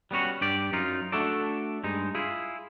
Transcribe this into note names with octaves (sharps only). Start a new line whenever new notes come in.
G3 B3 C#4 F#4
G2 G4 D5
F#2 D#4 F4
A3 D4 F#4 A4 D5
G2 G#3 D#4
E4 F4 G#4